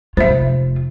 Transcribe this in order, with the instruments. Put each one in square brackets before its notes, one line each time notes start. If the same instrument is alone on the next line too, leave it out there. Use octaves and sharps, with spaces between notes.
[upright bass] F1 F4 [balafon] C5 E5